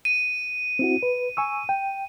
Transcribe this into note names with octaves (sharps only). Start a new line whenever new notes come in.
D#7
C4 E4 F#4
B4
G#5 C#6 E6
G5